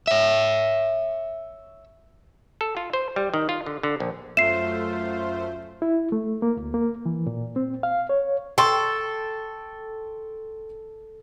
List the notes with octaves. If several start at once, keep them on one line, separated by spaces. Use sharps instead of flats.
C#5 E5
A4
F4
C5
G3
D#3
F4
D3
D3
A#1
F#2 A3 F4 C5 E5 C7 E7
E4
A3
A#3
D2
A#3
E3
A#2
C4
F5
C#5
A4 G5 C6 C#6